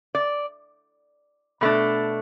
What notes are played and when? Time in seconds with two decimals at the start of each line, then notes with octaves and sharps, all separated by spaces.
0.15 D5
1.61 B2 A3 D4